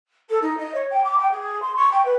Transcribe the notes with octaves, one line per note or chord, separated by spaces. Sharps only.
A4
D#4
D#5
C#5
G5
D6
G5
G#4
C6
C#6
G5
B4